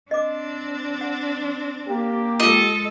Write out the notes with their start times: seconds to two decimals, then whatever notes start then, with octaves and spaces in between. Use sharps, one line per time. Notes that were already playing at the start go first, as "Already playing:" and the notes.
0.11 C4 D4 D#5 D6
1.01 F#5
1.87 A#3 G4
2.40 G#3 F4 A4 D#5